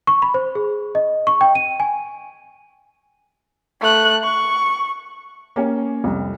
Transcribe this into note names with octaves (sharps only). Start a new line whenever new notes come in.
C#6
B5
C5
G#4
D#5
C#6
G5
D#7
G#5
A3 F#6
C#6
A#3 C#4 G4 C#5 G#5
C2 F2